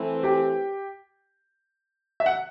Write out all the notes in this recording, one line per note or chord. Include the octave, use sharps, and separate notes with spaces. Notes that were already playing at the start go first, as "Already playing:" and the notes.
Already playing: E3 A3 C4
G4 G5
E5
F#5